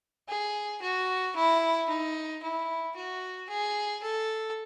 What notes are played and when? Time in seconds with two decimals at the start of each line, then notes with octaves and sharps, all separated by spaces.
0.29 G#4
0.82 F#4
1.36 E4
1.89 D#4
2.43 E4
2.96 F#4
3.49 G#4
4.03 A4